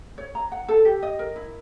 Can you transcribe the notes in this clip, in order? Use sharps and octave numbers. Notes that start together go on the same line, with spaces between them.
C#5
A#5
F#5
A4
G4
D#5
A#4
E4